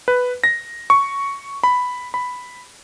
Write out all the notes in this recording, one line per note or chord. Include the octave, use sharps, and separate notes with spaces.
B4
A#6
C#6
B5
B5